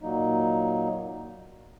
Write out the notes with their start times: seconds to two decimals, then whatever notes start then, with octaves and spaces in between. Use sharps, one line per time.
0.02 A#2 F#3 A#3 D#4